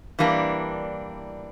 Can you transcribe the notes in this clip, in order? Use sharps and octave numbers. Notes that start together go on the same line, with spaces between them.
E3 G3 A#3 D4